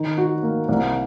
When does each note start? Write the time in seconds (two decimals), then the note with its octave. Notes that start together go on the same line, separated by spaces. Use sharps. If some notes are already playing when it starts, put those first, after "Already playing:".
Already playing: D#3
0.18 F#4
0.43 A#3
0.69 C2